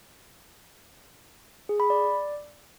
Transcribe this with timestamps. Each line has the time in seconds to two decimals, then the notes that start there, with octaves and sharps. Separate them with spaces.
1.69 G#4
1.80 B5
1.90 D5